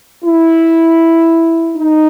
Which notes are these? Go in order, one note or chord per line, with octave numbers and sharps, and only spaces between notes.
E4
D#4